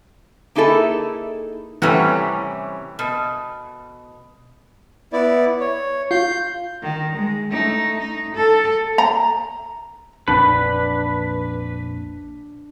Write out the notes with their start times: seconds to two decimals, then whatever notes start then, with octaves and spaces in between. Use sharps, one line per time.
0.55 A#3 D#4 E4 G#4 A4
1.82 A2 C3 E3 G3 C#4 F#5
2.99 B2
5.13 B3 E4 D5
5.60 C#5
6.11 F4 G6
6.82 D#3
7.16 G#3
7.51 A3 D#4
7.99 D#4
8.35 A4
8.98 A#5
10.28 A#1 F2 D4 B4